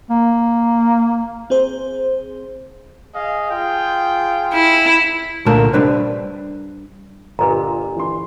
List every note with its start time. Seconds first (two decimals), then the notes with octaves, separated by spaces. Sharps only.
0.10 A#3
1.50 C4 G#4 C5
3.15 G#4 D#5 F5
3.51 F4 G#4 G5
4.53 E4
5.46 C2 A#2 D3 A3 A#4 A5
5.73 G3 D4 B4 C5
7.39 G1 A#2 F4 G4 A#4 B4 D#5 A#5
7.96 E3 C6